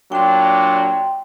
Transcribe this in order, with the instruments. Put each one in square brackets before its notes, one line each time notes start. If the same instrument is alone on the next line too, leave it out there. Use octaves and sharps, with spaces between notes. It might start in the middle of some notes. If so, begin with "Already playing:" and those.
[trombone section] A#2 F#3 D4 [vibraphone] G5 C6